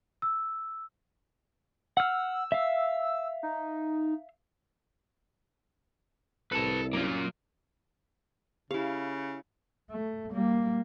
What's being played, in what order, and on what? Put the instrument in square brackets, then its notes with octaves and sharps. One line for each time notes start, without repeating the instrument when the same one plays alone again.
[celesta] E6
[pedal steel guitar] F#5 F6 [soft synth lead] E6
[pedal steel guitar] E5 F5
[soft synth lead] D#4
[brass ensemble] C2 [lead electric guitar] A4 [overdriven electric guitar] B4 A5
[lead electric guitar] F#3 C#4 [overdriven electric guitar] A#3 F4
[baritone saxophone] C#3 [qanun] E4 F5 [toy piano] G4
[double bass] A3
G3 A#3